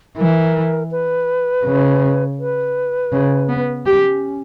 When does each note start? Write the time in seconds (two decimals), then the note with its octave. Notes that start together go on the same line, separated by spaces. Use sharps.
0.17 E3 A#4
0.91 B4
1.65 C#3
2.39 B4
3.12 C#3
3.49 B3
3.86 C#4 G4